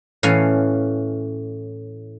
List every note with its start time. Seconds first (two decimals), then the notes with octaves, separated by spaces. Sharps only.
0.23 A2 E3 C#4 F5